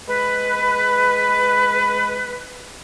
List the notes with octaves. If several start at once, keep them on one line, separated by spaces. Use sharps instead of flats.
G#3 B4